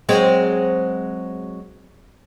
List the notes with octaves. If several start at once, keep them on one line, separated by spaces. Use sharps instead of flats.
F#3 G#3 C4